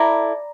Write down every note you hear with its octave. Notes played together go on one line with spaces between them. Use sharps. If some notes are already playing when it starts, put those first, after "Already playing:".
Already playing: E4 A4 D5 A#5